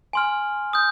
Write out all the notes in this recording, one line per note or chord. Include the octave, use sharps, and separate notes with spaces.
G#5 C6 F6
D#6 G6